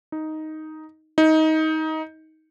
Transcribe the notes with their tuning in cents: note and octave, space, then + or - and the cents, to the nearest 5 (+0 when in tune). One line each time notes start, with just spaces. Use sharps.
D#4 +5
D#4 +20